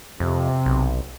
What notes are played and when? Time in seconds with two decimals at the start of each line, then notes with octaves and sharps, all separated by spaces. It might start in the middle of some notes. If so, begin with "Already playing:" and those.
0.20 F2 C3
0.66 B1